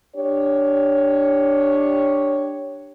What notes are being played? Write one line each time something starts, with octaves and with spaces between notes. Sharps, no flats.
D4 G4 C#5